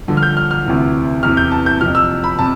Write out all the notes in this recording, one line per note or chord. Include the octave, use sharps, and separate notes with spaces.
G2 D3 F3
F6
G6
F6
F6
D2 C3 E3
E2 C3 E3 F6
G6
A5
G6
F2 C3 F3 F6
E6
B5
C3 A5